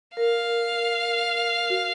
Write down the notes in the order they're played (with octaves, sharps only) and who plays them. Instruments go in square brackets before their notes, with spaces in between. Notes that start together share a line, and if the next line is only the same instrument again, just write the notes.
[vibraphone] A#4 [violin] F5
[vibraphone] F#4